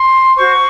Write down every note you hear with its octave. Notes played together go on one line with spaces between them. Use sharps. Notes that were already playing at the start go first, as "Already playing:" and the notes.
Already playing: C6
F#4 C5 C#6